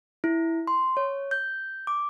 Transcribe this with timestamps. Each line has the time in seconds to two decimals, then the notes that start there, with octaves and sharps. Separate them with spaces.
0.24 E4
0.67 C6
0.97 C#5
1.31 G6
1.87 D6